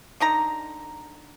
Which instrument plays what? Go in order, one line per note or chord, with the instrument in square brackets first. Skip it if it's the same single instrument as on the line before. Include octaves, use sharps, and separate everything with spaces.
[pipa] D3 D#4 A#5